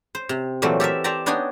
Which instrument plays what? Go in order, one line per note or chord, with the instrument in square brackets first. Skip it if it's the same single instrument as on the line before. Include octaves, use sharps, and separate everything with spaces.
[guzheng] C5
C3
A#2 E3 F#3 A3 C4
G4 A4 A#4 E5
C5 D5 E5 G5 A5 A#5
B3 D4 D#4 C#5 G5 G#5